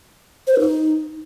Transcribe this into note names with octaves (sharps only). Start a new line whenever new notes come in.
C5
B4
D#4